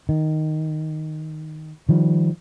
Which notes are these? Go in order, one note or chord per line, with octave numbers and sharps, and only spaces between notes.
D#3
D#3 F3 G3